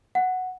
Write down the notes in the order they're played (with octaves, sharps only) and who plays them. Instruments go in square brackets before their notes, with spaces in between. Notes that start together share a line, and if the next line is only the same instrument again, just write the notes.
[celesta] F#5